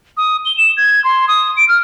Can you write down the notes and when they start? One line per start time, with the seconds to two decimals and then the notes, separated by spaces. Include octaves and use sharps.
0.17 D#6
0.45 G7
0.57 E7
0.77 G#6
1.04 C6
1.28 D#6
1.57 D7
1.68 F6